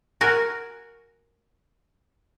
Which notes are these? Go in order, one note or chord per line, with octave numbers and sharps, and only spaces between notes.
F#4 A#4 G#5